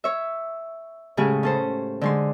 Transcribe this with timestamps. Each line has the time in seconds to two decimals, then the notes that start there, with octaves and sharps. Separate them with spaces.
0.04 C#5 E5
1.17 A2 C#3 G#3 G4 G#4
1.43 C#4 A4 C5
2.01 D3 G#3 C6